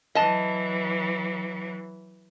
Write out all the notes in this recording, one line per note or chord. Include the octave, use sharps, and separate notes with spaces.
E3 F#3 D#5 A5